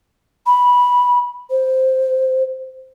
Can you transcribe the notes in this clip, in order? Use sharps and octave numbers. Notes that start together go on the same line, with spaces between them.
B5
C5